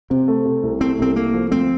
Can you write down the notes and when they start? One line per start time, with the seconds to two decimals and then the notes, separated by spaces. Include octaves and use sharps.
0.10 C3 C4
0.28 A3
0.46 C3
0.63 C2
0.80 A3 C4
0.98 C2 C4
1.16 A3 A#3
1.34 F3
1.51 D2 C4